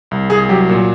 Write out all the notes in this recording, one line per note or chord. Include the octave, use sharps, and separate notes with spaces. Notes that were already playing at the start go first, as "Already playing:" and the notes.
C2
C2 G#4
F#3 G4
A#2